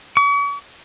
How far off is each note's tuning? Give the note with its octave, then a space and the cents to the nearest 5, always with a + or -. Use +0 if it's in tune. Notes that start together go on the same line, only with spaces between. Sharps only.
C#6 +45